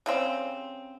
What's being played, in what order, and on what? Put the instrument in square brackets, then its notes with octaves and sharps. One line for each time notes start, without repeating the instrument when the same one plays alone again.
[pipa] C#3 G3 C4